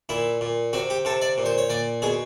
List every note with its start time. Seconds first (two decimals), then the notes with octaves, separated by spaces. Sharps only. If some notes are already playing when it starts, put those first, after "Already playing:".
0.09 A#2 E4
0.41 A#2
0.73 C3 F#4
0.90 G4
1.05 C3 A4
1.21 D5
1.38 A#2
1.46 C5
1.58 C#5
1.70 A#2 D5
2.02 B2 G#4